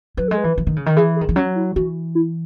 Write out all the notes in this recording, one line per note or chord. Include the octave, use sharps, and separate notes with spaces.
F#3 B4
G#3 A4
B4
E3
E3
D#3
C#3
D#3
E3 G#4
G#4
D#3
E3
F#3 C#4
E4
E3 F#4
E4